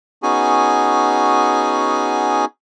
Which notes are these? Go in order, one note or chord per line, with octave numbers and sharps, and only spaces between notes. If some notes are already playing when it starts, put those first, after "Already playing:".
B3 C#4 D#4 F#4 G#4 G#5